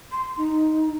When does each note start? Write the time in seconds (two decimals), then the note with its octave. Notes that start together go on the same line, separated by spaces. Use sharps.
0.12 C6
0.37 D#4